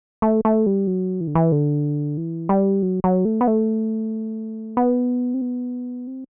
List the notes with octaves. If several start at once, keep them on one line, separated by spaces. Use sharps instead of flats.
A3
A3
G3
F#3
E3
D3
E3
D3
E3
G3
F#3
F#3
A3
B3
A3
B3
C4
B3
C4